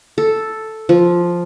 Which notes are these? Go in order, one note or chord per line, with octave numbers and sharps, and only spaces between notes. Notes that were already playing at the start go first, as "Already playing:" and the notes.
A4
F3